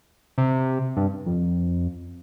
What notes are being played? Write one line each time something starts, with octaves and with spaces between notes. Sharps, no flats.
C3
G2
F2